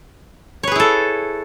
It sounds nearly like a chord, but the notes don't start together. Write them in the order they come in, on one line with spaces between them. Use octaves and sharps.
C#5 B4 G#4 E4 A4